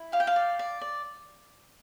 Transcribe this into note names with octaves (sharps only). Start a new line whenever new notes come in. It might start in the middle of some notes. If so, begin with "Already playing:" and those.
Already playing: E4
G4 F5
G5
F5
D5
D5
D5